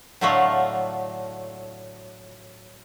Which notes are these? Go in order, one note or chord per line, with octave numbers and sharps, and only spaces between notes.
A2 D3 F#3 A3 F4 F#5